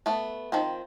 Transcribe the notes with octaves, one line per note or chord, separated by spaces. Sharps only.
A3 B3
D#3 F3 C4